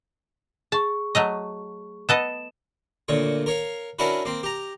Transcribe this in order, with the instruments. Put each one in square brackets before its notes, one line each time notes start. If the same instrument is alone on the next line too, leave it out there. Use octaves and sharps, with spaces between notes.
[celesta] G#4 C#6 [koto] A5
[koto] F#3 A3 D#5
[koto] B3 A4 D#5 [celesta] E7
[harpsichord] D2 A#2 C#5 C#6
A#4 C#5 F5
C#4 D4 E4 F#4 A#4 B4
A#3 C4
G4 A#5